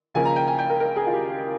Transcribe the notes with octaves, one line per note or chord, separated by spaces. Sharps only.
C#2 C#3 F3 A#3 G#5
A#5
G5
G#5
G5
A#4
A#4
G#4
F4
G4